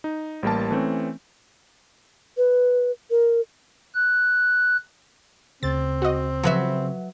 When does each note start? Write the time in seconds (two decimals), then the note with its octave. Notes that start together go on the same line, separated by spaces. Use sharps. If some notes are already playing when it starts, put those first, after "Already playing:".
0.04 D#4
0.43 A1 G3 A#3 A#4 A5
0.71 E3 A3 C4 C#4
2.37 B4
3.11 A#4
3.94 F#6
5.63 D2 C#3 C4 A6
6.02 F#4 D#5
6.44 C#3 F3 F#3 B4 E5